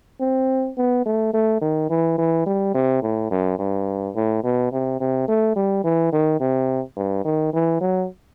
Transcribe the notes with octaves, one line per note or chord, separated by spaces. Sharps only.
C4
B3
A3
A3
D#3
E3
E3
G3
C3
A2
F#2
G2
A2
B2
C3
C3
A3
G3
E3
D#3
C3
G2
D#3
E3
F#3